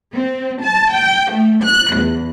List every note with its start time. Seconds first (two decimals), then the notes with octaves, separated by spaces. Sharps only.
0.16 C4
0.63 A5
0.92 G5
1.31 A3
1.62 F#6
1.92 E2